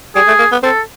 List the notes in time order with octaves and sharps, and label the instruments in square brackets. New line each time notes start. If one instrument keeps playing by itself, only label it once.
[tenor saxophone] G3 [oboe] G#4
[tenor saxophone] A3
A#3
B3
[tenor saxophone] C4 [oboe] A4